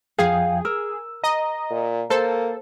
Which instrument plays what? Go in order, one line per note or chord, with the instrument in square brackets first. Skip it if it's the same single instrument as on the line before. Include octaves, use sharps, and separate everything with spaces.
[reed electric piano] F2 F3 G5 [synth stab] G#4 [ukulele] F5
[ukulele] A#4 [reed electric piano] E6
[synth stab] D#5 [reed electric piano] A#5
[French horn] A#2
[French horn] A#3 [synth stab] A4 [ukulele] C5